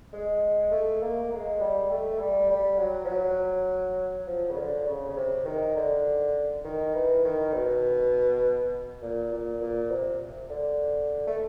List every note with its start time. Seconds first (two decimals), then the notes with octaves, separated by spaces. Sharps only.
0.13 G#3
0.72 A3
1.01 A#3
1.31 G#3
1.60 G3
1.91 A3
2.20 G3
2.50 G3
2.79 F#3
3.05 F3
3.09 F#3
4.27 F3
4.50 C#3
4.57 D3
4.87 C#3
5.09 C#3
5.16 C3
5.45 D#3
5.76 D3
6.65 D#3
6.94 E3
7.24 D#3
7.53 B2
9.02 A#2
9.32 A#2
9.61 A#2
9.91 C3
10.50 D3
11.27 A3